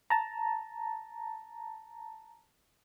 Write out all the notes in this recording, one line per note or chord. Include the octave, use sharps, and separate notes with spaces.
A5 A#5